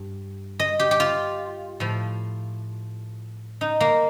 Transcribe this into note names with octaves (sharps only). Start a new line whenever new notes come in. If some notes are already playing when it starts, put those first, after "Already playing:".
Already playing: G2
D#5
G4
G4
F4
A2 F3
D#4
A#3